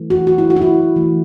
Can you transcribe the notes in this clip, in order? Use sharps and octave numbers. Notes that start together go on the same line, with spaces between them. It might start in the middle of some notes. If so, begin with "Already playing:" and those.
Already playing: E3 A3
F#4
F#4
E4
F#4
E4
F#4
E3 A3